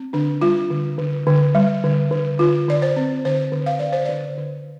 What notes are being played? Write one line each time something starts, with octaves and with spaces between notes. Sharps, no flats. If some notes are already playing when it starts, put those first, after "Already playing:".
Already playing: C4
D3 D4
G3 F4
D3
D3
D3
G3
D3
D3
D3 F4
D3 D5
C5
C4
D3 C5
D3
F5
D3 D5
C5
D3 D5
D3